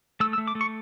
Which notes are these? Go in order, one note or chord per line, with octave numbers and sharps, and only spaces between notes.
A3 E6
E6
A3
D6
A3
C#6